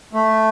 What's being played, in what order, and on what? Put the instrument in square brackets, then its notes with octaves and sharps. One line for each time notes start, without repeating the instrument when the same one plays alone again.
[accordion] A3